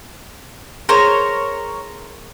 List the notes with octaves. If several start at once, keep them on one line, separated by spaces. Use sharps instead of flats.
G#4 A#4 C5 C#5